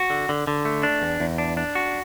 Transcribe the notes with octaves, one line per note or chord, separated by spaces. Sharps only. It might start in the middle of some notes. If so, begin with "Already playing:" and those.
Already playing: F#4
D3
D3
D3
A3
D4
E2
E2
D4
D4
F#4